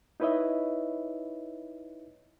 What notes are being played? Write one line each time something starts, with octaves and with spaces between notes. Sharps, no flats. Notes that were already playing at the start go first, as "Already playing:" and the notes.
D#4 E4 B4 C#5 D#5 E5